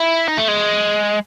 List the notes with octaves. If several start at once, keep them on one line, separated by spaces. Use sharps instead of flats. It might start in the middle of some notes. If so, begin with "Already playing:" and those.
Already playing: E4
D#4
A3
G#3